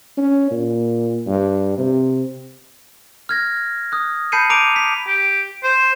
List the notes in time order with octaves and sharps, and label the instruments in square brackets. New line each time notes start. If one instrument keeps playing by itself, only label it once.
[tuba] C#4
A#2
G2
C3
[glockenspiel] F6 G#6 A#6
D#6 F#6
A5 B5 G6 C7 C#7 D#7
A#5 D6 D7 D#7 F7
B6
[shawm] G4
C5